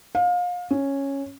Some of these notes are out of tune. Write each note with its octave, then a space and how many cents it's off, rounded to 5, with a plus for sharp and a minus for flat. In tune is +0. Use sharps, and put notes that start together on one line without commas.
F5 +30
C#4 -5